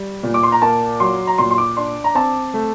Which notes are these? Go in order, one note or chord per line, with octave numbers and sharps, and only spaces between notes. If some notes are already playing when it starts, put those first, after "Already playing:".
Already playing: G3
A#2
D6
C6
A#5
A#3 A5
F#3 C6
A#5
A#2 C6
C6
D6
D4 C6
A#5
C4 A5
A3